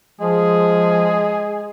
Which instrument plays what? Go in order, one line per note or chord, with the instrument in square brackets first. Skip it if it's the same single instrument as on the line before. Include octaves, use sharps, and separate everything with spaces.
[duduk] F3 [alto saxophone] G#3 [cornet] G#4